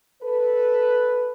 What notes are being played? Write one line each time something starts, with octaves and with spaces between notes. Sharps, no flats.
A4 B4